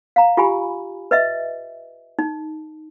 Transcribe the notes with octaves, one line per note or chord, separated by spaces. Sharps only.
F5 A#5
F4 G4 G#5 B5
B4 D#5 E5
D#4